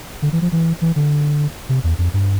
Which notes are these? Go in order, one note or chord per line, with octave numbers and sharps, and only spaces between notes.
D3
E3
F3
E3
E3
D3
C3
E2
F2
G2